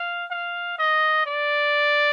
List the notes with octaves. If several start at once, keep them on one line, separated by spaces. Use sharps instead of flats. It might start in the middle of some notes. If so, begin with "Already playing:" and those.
Already playing: F5
F5
D#5
D5